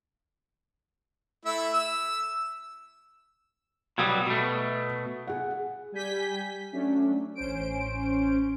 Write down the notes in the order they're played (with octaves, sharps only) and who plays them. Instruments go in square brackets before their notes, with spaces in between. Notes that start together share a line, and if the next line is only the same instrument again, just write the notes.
[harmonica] A3 E4 E5
E6
[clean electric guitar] B2 F#3 G3 [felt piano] D#6 E6 G#6
[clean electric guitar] B2 A3
[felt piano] G#4 F#5
[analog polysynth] G3 G#5 G6 B6
F#3 A3 C#4 D4
A1 C#4 C5 D7